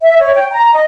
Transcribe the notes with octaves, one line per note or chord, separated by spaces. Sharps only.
E5
C#5
G5
A#5
D#5